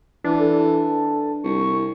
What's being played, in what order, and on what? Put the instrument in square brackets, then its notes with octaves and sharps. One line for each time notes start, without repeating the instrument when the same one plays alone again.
[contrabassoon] E3 [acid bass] D4
[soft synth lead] A4
[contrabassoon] C2 [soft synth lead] C#6